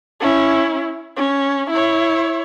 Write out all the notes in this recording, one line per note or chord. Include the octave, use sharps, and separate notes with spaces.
C#4 E4
C#4
E4 C#5